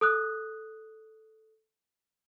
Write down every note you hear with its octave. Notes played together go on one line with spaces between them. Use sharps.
A4 D#6 F#6